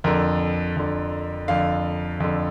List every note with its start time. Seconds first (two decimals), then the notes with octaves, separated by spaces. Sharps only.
0.04 F2 D3 A#4
0.77 F2 D3
1.48 F2 D3 F5
2.20 F2 D3